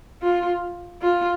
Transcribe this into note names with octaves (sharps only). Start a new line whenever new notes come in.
F4
F4